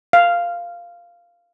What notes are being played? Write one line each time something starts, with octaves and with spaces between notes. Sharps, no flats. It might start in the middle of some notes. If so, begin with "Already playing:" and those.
F5